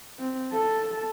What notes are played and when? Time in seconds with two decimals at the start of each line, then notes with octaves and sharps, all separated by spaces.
0.19 C4
0.53 A4 A5